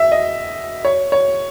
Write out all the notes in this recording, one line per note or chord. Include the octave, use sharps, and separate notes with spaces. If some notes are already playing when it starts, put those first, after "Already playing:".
Already playing: E5
D#5
C#5
C#5